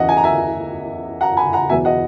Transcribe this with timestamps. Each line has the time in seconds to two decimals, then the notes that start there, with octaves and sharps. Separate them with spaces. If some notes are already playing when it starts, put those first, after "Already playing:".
Already playing: E2 C#3 E3 D#5 F#5
0.09 G#5
0.17 A#5
0.24 E5 G#5
1.21 F#5 A#5
1.37 G#5 B5
1.53 F#5 A#5
1.69 E2 B2 F#3 B3 E5 G#5
1.85 D#5 F#5